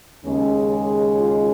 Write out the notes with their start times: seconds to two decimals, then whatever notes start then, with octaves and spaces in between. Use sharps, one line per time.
0.24 D#2 C#3 G#3 C#4
0.69 G#4
1.16 F4